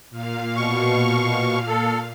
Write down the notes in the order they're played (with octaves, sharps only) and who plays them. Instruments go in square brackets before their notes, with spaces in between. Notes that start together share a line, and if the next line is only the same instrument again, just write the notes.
[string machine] A#2 F5
[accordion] B2 C#6
A4